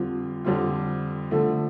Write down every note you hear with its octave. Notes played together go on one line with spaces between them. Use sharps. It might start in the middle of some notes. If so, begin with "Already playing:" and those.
Already playing: F2 D3 G3 C4 F4
F2 D3 G3 C4 F4
D3 F3 A3